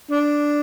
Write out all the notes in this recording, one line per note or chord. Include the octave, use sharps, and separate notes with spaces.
D4